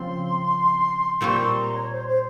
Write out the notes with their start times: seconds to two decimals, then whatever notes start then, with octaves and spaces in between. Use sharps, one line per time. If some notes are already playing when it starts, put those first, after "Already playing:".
Already playing: C#3 F3 C4 C6
1.20 A#2 G3 C4 G4 C#6
1.30 A#5
1.39 C6
1.57 A#5
1.75 C#5
1.94 C5
2.07 C5